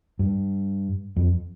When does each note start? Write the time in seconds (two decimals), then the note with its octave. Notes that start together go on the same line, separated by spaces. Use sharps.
0.19 G2
1.16 F2